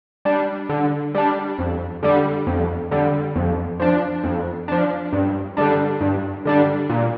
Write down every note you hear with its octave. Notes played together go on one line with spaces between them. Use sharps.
G3 D4
D3
G3 D4
F2
D3 G3
F2
D3 G3
F2
F3 D4
F2
F3 D4
G2
D3 G3 D4
G2
D3 G3 D4
A#2